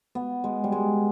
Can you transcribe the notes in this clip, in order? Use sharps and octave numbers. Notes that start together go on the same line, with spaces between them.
B3
G#3
G3
G#3